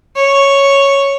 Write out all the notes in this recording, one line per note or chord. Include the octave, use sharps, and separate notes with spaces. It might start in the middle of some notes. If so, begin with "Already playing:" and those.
C#5